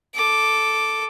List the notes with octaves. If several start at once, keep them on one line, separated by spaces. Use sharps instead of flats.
A4 D6